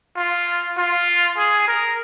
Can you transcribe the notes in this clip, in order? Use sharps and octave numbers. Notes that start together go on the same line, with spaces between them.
F4
F4
G#4
A#4